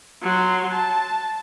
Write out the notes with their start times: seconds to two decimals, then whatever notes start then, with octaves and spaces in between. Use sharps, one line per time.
0.22 F#3 C6
0.71 A5